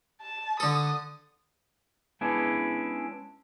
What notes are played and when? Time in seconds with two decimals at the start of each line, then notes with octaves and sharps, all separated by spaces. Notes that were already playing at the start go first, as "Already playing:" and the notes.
0.21 A5
0.60 D3 A4 D#6
2.21 G#3 B3 C#4 D4 E4